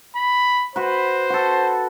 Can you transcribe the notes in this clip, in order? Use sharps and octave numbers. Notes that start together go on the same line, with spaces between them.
B5
F#4 B4 C5
F#4 A4